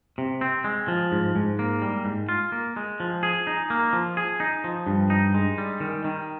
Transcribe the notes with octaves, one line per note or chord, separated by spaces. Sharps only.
C3
C4
G#3
F3
G#2
G#2
A#3
G3
G#2
F4
A#3
G#3
F3
G#4
D#4
A#3
F3
G#4
D#4
F3
G2
D#4
G#3
G3
D#3
D#3